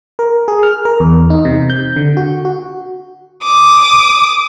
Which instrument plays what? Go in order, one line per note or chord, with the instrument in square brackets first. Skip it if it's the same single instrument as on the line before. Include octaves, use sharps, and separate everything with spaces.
[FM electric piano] A#4
G#4
F6
A#4
E2
D#4
C3
G6
D3
F#4
F#4
[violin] D6 D#6